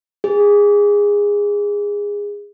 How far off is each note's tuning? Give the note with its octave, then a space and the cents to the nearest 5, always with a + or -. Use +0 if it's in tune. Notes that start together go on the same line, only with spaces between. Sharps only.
G#4 -20